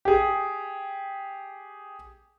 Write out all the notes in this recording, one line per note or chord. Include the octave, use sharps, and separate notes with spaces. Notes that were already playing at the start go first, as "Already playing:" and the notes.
G4 G#4